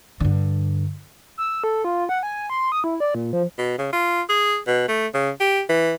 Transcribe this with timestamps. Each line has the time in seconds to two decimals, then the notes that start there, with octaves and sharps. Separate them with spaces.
0.20 G2 D3
1.38 E6
1.64 A4
1.84 F4
2.09 F#5
2.23 G#5
2.50 C6
2.72 D#6
2.84 E4
3.00 D5
3.15 A#2
3.33 F3
3.58 B2
3.79 C#3
3.93 F4
4.29 G#4
4.67 B2
4.88 A3
5.14 C#3
5.40 G4
5.69 E3